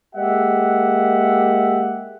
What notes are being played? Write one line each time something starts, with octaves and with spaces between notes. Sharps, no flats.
G#3 A#3 G4 E5 F#5